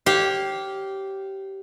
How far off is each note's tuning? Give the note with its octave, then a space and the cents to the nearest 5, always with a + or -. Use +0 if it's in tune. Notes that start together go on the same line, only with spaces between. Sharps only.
G4 -15 C#5 -35 F5 +5